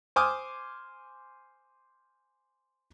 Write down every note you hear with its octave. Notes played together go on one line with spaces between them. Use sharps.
C5 G#5 C6 D6 D#6 F6